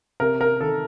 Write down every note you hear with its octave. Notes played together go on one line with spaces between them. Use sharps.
C3 A#4
A#4
D#3 A4